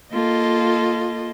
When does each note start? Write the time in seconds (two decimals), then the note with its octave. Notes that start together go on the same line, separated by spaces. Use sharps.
0.13 A#3 F4 A4 D#5